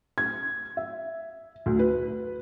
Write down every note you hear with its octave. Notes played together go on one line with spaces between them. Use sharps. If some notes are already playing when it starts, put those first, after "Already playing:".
G#6
E5
D2
B4